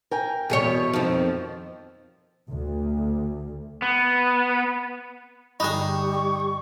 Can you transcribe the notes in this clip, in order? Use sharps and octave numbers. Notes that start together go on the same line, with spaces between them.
A#4 G5 G#5
E2 B2 G#4 C#5
F2 D#3 F3 C4
D2
B3
G2 D3 G3 D#4 G#4 C#6